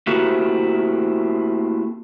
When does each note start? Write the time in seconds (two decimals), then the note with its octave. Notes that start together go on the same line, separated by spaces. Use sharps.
0.07 A3 A#3 C4 E4 F#4 G4